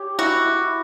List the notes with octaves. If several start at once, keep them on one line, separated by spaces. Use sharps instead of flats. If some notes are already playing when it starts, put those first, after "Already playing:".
Already playing: G4 C#5
E4 F#4
E4